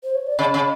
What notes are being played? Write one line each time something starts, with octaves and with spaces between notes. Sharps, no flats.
C5
C#5
D5
C#3 D#5
C#3